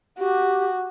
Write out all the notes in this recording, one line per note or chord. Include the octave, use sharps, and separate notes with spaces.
F#4 G4